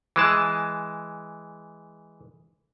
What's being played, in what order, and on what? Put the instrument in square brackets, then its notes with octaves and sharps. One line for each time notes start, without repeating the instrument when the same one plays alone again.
[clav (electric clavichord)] E3 G#3 A5